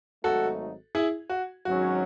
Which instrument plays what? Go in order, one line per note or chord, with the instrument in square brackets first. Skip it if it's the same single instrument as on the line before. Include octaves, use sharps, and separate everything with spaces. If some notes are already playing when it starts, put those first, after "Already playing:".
[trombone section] G#1 G#2 F#3 A3 D#4 [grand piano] F#4 A4
[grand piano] E4 G#4
F#4
[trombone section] G#1 G#2 F#3 C#4 [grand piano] F#4